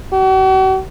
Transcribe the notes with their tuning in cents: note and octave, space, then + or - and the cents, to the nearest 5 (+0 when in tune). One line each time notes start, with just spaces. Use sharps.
F#4 +45